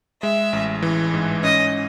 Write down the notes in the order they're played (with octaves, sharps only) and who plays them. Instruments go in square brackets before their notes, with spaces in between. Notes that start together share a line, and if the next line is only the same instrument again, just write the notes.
[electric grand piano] G#3 [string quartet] E5
[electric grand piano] A1
E3
G#2
[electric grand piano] C#4 [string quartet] D#5